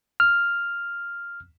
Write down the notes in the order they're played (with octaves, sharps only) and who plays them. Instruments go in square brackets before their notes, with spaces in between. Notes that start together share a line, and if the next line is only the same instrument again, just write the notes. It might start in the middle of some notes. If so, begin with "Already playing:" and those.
[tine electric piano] F6